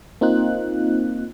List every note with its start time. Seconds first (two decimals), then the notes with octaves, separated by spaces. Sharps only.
0.21 A#3 C4 D#4 F4 F#6